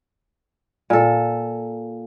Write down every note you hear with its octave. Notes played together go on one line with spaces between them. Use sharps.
A#2 A4